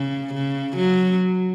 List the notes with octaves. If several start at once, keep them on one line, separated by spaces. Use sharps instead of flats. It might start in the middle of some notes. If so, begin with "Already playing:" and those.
Already playing: C#3
C#3
F#3